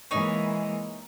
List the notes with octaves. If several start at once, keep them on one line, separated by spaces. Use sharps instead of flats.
E3 G#3 A#3 D#4 C#5